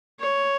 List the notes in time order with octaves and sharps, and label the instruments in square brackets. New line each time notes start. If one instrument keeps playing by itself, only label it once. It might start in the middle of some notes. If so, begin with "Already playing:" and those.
[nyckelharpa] C#5